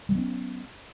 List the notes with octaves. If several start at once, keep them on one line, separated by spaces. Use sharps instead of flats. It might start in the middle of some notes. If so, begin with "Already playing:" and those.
F#3 G3 B3 C#4